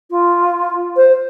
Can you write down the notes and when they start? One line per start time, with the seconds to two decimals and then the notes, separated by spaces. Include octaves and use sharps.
0.11 F4
0.97 C5